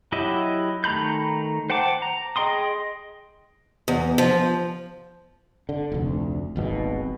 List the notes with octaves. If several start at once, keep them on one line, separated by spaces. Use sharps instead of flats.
F#3 E4 G4 D#5 E5
D#3 A3 A#5 B5 G6
C5 F#5 G5 A5 D6
A#5
G#4 D#5 G5 C6 D#6
E2
F3
D3
F1 D2
D#1 G#1 B2